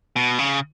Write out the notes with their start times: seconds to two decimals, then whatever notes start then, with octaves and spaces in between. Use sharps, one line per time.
0.16 B2
0.39 C#3